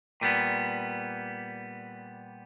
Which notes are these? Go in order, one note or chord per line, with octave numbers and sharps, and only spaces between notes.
A#2 G3 B3